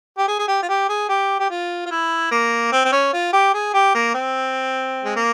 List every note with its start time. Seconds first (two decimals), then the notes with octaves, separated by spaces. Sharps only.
0.18 G4
0.28 G#4
0.39 G#4
0.48 G4
0.63 F4
0.69 G4
0.89 G#4
1.09 G4
1.39 G4
1.50 F4
1.86 F4
1.91 E4
2.31 A#3
2.72 C4
2.85 C4
2.92 C#4
3.13 F4
3.33 G4
3.54 G#4
3.74 G4
3.95 A#3
4.14 C4
5.05 G#3
5.16 A#3